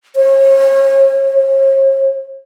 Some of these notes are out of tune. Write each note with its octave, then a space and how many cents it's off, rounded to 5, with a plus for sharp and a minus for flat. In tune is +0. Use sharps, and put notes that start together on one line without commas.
C#5 -40
C#5 -45